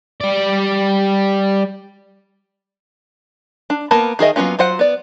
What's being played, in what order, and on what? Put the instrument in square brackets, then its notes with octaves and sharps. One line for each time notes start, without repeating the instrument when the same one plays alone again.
[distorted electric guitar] G3 D5
[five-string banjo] D4
A#3 B3 A#4 A5 B5
D#3 G#4 A#4 D#5 E5
F#3 A#3 B3 C#4 F4
F#3 F4 C5 F#5
B3 D5